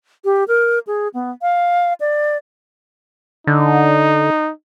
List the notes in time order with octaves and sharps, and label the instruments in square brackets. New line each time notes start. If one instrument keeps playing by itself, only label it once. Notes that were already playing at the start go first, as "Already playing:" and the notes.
[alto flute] G4
A#4
G#4
B3
F5
D5
[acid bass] D3 [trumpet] D#4